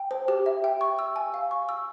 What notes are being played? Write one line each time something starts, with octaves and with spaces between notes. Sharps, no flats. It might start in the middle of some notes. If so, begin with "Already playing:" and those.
Already playing: G5
C5
G4
E5
G5
C#6
E6
G#5
F5
C#6
E6